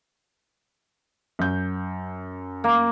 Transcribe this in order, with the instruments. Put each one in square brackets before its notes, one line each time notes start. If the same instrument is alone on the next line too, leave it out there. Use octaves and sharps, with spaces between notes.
[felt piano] F#2 G6
[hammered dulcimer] A#3